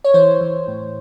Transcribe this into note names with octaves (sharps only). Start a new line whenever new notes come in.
C#5
E3 C5
E3
A2